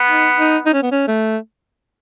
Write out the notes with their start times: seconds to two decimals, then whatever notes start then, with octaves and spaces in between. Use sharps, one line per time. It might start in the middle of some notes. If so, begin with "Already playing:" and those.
Already playing: B3
0.09 D#4
0.38 D#4
0.66 D#4
0.73 C#4
0.83 B3
0.92 C#4
1.08 A3